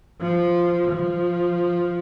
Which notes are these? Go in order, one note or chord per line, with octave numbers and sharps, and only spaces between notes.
F3
F3